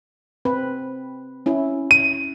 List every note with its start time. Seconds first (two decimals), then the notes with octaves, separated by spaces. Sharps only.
0.45 C4 B4
1.46 C#4 E4
1.91 D#7